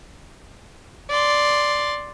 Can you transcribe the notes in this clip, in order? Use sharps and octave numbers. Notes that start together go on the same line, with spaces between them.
D5 C6